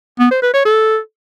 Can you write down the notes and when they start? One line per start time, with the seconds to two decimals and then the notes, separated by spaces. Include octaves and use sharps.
0.19 B3
0.31 C5
0.42 B4
0.54 C#5
0.65 A4